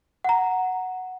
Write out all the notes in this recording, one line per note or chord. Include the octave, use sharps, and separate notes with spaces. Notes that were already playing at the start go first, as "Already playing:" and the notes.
F#5 A#5